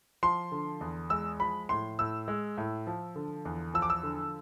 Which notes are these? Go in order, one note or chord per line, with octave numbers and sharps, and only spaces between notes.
F3 C6
D3
E2
G#3 E6
F3 B5
A2 C6
A2 E6
G#3
A2
F3
D3
E2
F3 E6
D6
E6
D3